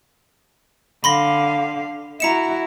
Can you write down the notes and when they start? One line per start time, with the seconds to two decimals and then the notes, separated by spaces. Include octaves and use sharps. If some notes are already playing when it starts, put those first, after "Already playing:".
1.04 D3 F5 B5 C6 A#6
2.20 E4 F#4 A#5 C#7 E7